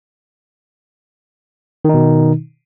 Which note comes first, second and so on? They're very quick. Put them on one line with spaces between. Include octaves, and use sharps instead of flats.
D#3 D#4 B2